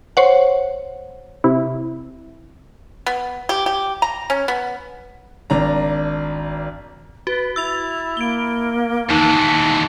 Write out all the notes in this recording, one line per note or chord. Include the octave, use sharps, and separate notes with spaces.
C5 C#5 F#5
C3 E4
B3
G4
G4
A#5
C#4
B3
G#1 D4 A#5
F#4 B4
E4 E6 A6 F7
A#3 D7 G7
D#2 E3 D#4 A5